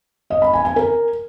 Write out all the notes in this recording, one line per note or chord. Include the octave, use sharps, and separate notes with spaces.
D#5
B5
G#5
G#5
A#4